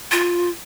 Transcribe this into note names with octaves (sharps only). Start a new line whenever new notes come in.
F4